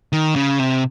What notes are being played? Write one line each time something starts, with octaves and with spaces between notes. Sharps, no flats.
D#3
C#3
C3